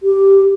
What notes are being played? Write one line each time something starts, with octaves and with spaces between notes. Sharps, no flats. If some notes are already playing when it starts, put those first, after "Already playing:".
G4